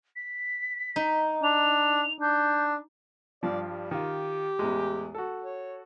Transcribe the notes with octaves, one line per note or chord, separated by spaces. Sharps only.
B6
D#4
D4 F7
D4 G6
G2 F3 D5
G3
D#3 F4 G4
A1 E2 G#3
F#4 A4
C#5